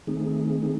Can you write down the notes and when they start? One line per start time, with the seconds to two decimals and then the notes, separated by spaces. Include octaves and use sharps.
0.07 D#3 A3 C4 D#4 G#4
0.62 D#3 A3 C4 D#4 G#4